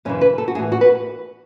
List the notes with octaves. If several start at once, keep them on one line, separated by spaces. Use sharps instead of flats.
F#2 C#3 E3 C#4
B4
A4
F#4
A2 E3 G#4
F#4
B4